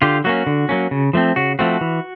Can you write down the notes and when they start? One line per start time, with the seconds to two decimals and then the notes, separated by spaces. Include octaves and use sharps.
0.02 D3 F4 G4
0.24 F#3 A#3 C#4 F#4
0.47 D3
0.69 F#3 A#3 C#4
0.91 C#3
1.13 F3 A3 C4
1.36 C#3 F#4
1.59 F3 A3 C4 F#4
1.81 E3